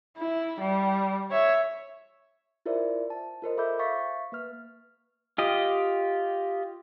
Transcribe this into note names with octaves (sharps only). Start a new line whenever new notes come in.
E4
G3
C#5 E5
E4 F4 A#4 C5 D5 E5
A5
F4 A#4 C5 D#5
A4 E5 B5 D6 E6 G6
E5 F5 C#6 A6 B6
A#3 B4 F6
F4 G4 D#5